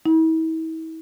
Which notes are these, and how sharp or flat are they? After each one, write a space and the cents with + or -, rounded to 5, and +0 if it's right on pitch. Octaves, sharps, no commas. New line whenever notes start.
E4 -40